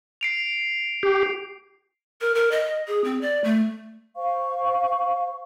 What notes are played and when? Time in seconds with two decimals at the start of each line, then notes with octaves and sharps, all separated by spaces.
0.21 C7 D7 F7
1.03 G4
2.21 A#4
2.35 A#4
2.51 D#5
2.88 G#4
3.04 C4
3.21 D5
3.44 A3
4.16 C5 F5 C#6